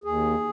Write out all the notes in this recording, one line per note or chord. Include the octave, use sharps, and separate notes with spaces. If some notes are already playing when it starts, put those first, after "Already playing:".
D#2 G#4